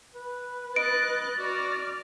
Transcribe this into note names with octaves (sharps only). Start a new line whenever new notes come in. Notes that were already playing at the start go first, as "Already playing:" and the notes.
B4
D#5 F#6 A6 D7
F#4 D5 F6